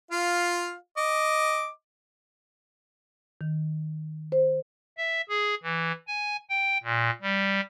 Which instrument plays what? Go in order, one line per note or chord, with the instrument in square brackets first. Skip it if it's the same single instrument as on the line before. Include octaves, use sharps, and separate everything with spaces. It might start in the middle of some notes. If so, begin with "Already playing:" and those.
[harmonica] F4 F5
D#5 D6
[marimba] D#3
C5
[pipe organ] E5
G#4
E3
G#5
G5
A#2
G3